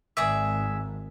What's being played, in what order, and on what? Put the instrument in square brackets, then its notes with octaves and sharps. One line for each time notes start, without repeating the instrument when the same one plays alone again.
[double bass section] G#1 [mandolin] G#4 D5 E5